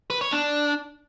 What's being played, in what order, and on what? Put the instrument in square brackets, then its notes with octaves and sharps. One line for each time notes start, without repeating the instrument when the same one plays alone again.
[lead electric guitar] B4
C#5
D4